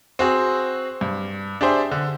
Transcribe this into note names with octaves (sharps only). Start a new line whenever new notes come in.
C4 F#4 G#4
G2
D4 G4 G#4 C5 E5
D3